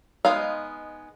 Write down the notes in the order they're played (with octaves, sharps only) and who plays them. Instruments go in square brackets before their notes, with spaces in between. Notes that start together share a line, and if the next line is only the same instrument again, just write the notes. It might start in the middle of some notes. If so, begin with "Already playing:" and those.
[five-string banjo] G#3 B3 D#4 F5